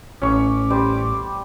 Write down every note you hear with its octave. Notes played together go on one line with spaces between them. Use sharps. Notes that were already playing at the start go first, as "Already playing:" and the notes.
A1 C#4 C#6 D6
G3 C5